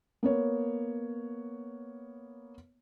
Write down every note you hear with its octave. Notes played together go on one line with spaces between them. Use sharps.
A#3 B3 C#5